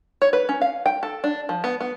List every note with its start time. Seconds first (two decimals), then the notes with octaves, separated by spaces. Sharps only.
0.22 C#5
0.33 B4
0.49 C#4
0.61 F5
0.86 G5
1.03 A4
1.24 D4
1.49 F3
1.64 B3
1.81 B3